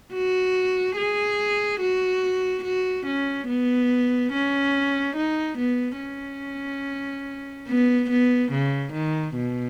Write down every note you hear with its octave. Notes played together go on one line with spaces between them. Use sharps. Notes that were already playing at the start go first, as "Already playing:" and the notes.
F#4
G#4
F#4
F#4
C#4
B3
C#4
D#4
B3
C#4
B3
B3
C#3
D#3
B2